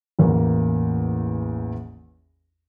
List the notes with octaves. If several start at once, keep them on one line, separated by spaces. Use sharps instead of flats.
A1 E2 A#3 A#4